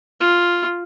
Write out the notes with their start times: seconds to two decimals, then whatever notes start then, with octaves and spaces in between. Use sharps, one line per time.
0.21 F4